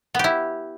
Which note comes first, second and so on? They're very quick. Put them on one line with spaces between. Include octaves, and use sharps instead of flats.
B3 G4 E4